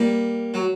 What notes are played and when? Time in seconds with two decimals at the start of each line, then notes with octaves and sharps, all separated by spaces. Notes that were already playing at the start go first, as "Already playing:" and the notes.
Already playing: G3 A#3
0.54 F#3